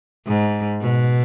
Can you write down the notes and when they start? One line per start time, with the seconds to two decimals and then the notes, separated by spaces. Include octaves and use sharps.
0.27 G#2
0.81 B2